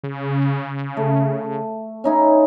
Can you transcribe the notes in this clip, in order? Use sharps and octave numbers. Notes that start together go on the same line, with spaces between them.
C#3
A3
C#4 D#4 E4